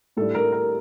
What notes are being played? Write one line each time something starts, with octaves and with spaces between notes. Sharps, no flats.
A2 G3 D4 A4
A#4
A#4